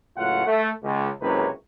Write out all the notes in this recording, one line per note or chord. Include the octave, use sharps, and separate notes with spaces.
C#2 A2 F#3 F4 F#5
A3
C#2
F#1 C#2 C3 B4 C#5 A#5